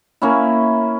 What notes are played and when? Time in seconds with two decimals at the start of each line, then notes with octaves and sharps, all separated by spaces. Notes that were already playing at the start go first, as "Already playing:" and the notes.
0.22 A#3 C#4 E4